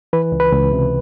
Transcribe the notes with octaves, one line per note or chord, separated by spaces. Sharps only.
E3 B4
C#2
B4
C#2
C3